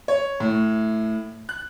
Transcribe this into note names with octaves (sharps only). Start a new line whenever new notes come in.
C#5
A2
F#6